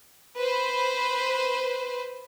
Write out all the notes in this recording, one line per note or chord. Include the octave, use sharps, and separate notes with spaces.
B4 C5